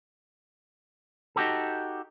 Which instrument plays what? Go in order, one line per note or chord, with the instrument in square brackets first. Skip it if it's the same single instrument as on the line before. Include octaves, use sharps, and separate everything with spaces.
[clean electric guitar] D#4 F#4 G4 A4